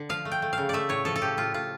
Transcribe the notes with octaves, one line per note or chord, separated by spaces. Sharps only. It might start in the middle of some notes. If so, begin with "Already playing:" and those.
Already playing: D3
F3 F5
A3
G5
A3
C#3 F5
A3 D5 E5
A2 C#5
F3 A4
A4
F3 G4
A2 F4
A2 F4